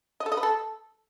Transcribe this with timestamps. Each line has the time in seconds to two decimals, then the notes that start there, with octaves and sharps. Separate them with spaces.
0.20 D#5
0.26 A4
0.32 D#5
0.37 B4
0.43 A4